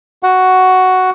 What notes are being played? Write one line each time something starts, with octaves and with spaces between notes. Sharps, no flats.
F#4 F#5